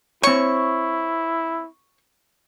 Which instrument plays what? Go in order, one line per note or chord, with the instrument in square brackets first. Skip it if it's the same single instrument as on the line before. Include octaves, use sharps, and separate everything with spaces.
[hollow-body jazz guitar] C4 C#5 [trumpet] E4 [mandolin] C#6